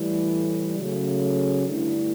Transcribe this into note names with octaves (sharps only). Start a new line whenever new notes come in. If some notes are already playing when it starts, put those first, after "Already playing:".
Already playing: A2 E3 G3
C#3 F#3 A3
G2 D3 A3 E4